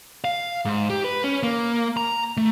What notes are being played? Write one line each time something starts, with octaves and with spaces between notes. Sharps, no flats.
F5
G#2
G4
B4
C#4
A#3
A#5
A3